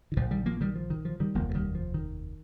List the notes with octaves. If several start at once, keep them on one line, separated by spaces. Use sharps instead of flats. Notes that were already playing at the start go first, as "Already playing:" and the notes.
D#3
A#1 A#2 F3
D#3 G3
F3 A#3
D#3 G3
F3
D#3
F3
D#3 G3
F1 D#2 F3 A#3
F3
D#3 G3
F3
D#3